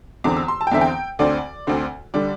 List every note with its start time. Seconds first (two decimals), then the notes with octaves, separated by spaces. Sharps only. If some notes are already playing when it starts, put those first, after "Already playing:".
0.24 E2 D3 C4 D6
0.37 E6
0.48 C6
0.61 A5
0.67 G5
0.71 E2 D3 C4 E5
0.81 G5
1.19 D2 D3 C4 D5
1.67 D2 D3 C4
2.14 D3 G3 D5